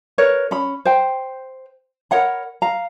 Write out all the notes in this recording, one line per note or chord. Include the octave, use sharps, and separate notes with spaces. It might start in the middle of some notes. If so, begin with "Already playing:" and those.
A#4 B4 C#5
C#4 B5
C5 G5
A#4 C#5 F#5 B5
F5 A#5